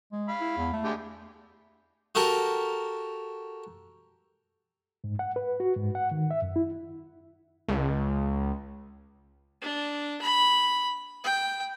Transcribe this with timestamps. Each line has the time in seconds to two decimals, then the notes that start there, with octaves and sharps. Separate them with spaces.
0.12 G#3
0.28 F5 B5
0.40 E4
0.57 E2
0.73 A3
0.84 D3 G#3 G4
2.15 F#4 G4 A4 A#4
5.04 G#2
5.19 F#5
5.36 B4
5.60 F#4
5.76 G#2
5.95 F#5
6.11 D#3
6.31 E5
6.42 F#2
6.56 E4
7.68 C#2
9.62 D4
10.21 B5
11.24 G5